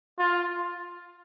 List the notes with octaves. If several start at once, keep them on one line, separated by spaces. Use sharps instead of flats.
F4